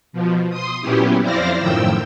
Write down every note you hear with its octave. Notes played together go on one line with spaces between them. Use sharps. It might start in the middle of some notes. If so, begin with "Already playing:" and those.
B2 F3
C6 D#6
A#2 F#3 B3 C#4 E4 G4
F2 E4 C5 D5 F5 A#6
F#2 A2 D#3 F3 G5 E6